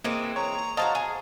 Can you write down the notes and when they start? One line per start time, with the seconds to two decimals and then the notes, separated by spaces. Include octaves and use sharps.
0.04 E3 G#3 A#3 C4
0.36 C#5 A#5
0.77 F#4 C5 D#5 F5 A5
0.95 G#4